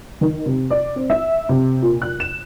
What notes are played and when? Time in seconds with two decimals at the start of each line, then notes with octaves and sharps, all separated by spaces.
0.21 D#3
0.46 C3
0.70 D5
0.96 C4
1.10 E5
1.49 C3
1.82 A#2
2.02 F#6
2.20 E7